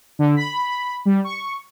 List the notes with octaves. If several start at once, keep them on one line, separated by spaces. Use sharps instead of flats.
D3
B5
G3
C#6